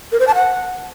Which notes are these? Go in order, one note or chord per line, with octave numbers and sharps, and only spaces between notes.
A#4
C5
A5
F#5